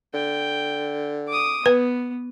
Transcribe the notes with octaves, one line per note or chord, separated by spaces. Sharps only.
D3 G5
D6 D#6
B3 B4